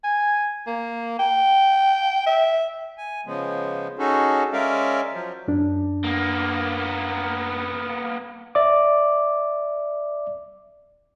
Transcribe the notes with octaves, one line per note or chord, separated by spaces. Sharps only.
G#5
A#3
G5
E5
G#5
C#3 F3 G#3 B3
C#4 D#4 F#4 G#4 A4
G#3 C#4 A#4 D5 E5 F5
F3 F#3
F#2 D4
A#3 B3
D5 E5 D6